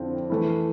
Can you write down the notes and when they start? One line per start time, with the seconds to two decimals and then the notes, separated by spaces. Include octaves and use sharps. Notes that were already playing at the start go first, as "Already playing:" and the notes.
Already playing: F2 D3 F3 C4 E4
0.30 E3 A3 E4